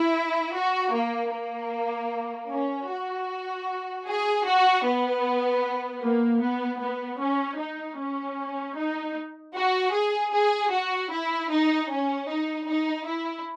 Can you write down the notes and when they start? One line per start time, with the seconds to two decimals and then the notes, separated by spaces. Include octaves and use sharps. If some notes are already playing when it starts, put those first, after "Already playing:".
Already playing: E4
0.55 F#4
0.93 A#3
1.33 A#3
2.50 C#4
2.89 F#4
4.07 G#4
4.46 F#4
4.85 B3
6.02 A#3
6.42 B3
6.81 B3
7.20 C#4
7.59 D#4
7.99 C#4
8.76 D#4
9.55 F#4
9.94 G#4
10.33 G#4
10.72 F#4
11.11 E4
11.51 D#4
11.90 C#4
12.29 D#4
12.68 D#4
13.07 E4